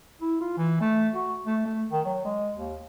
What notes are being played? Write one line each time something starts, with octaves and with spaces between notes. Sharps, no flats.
E4
F4
E3
A3
F#4
A3
A3
D#3
F#3
G#3
D#2